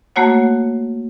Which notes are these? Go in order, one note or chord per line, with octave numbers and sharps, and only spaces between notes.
A3 A#3 F#4 C#5 F#5